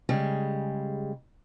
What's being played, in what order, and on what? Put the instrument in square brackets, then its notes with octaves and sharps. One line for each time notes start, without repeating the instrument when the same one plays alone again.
[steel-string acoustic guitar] C#3 G3 G#3